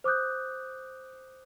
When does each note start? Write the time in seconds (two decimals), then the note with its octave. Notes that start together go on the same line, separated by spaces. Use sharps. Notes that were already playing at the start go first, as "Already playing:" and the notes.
0.04 C5 D6 D#6 F#6 G6